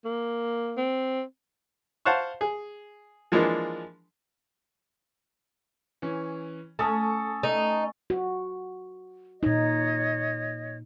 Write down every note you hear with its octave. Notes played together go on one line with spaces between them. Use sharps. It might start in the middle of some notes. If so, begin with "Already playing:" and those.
A#3
C4
C5 F5 F#5 A5 C#6
G#4
E3 F3 G#3 A#3 D4
E3 C#4
A3 C#4 A4 A5 C#6 D#6
A3 D#4
F#4
A#2 D#4 C#5 D#5